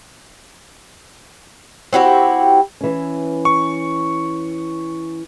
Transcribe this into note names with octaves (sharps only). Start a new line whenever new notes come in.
C4 E4 F#4 G4
E3 C#4
C#6